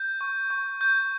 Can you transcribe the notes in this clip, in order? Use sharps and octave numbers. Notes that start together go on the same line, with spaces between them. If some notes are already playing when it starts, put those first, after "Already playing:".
Already playing: G6
C#6
C#6
G6